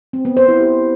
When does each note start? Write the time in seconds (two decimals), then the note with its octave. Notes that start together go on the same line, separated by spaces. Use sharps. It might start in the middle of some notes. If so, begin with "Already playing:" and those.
0.13 C4
0.25 B3
0.37 C5
0.48 E4
0.60 G4